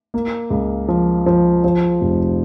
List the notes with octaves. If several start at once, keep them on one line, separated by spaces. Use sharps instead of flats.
A#3
C#2
F3
F3
F3
F1